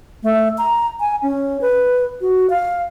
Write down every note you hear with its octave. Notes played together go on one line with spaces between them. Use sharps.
A3
A#5
G#5
C#4
B4
F#4
F5